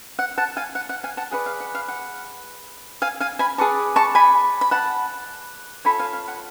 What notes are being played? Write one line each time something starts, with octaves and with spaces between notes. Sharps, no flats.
F#5
F#5 A5
F5 G#5
F#5
F#5
F5 G#5
F#5 A5
G#4 B4 D5 F#5
F5
F#5
F5
F#5
F5 G#5
F5 G#5
G#5 B5
G#4 B4 D5 A5 C#6
A5 C#6
G#5 B5
B5
F#5 A5
F4 A4 C#5 G#5 B5
F5 G#5
F5
F#5